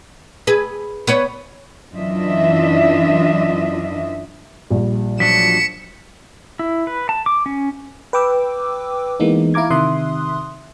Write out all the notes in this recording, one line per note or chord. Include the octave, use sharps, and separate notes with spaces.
G#4 B4
B3 B4 C#5
F#2 E3 D4 F4 D#5 E5
A#1 G3
F3 F#3 D4 B6 C#7 E7
E4
B4
A5
D6
C#4
B4 G5 D6 E6
E3 G#3 A#3 B3 D#4
E4 F5 A#5 D6 G#6
C3 D#3 E5 C6 D#6 F#6